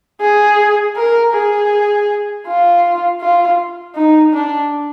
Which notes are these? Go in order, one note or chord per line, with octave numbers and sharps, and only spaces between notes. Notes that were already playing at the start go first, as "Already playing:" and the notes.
G#4
A#4
G#4
F4
F4
D#4
D4